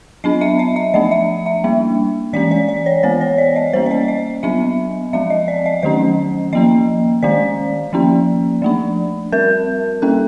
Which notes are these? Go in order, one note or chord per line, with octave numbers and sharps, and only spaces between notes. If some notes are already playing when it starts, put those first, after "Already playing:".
F#3 B3 D4 D#5
E5
D#5
E5
F3 A3 D4 D#5
E5
E5
G3 A#3 D4
E3 G#3 C#4 D5
D5
D5
C#5
E3 G#3 B3 C5
C#5
D5
D#5
G3 A#3 C#4 C5
D5
D#5
D#5
F#3 B3 D4 E5
F3 G#3 C4 E5
D#5
D5
D#5
D#3 F#3 A3 C#4 D#5
F3 A#3 C#4 D#5
D#3 G#3 C#4 D5
F3 A#3 C#4
F3 A3 D4
G3 C4 A#4
G3 A#3 C#4 A4